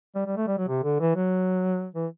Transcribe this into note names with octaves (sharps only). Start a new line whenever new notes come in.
G3
G3
A3
G3
F#3
C3
D3
E3
F#3
E3